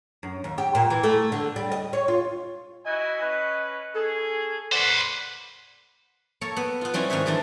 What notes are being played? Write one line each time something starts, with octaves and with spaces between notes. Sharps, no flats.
F#2
D#2
G4
A#2
E3
A3
D3
G3
D#5
C#5
F4
E4 F#4 D#5 G#5
C#4 B4
C#4 G#4 A4
A#3 B4 C5 D5 F#5
A#3 A4 C#5
B3
B3 F4
G3 C4 C#4 E4
G#2 D#3 D#4 B4 C#5 E5
E3 G3 C4 D4